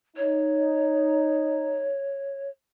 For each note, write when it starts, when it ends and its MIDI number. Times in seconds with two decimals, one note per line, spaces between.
0.16 1.91 63
0.16 2.48 73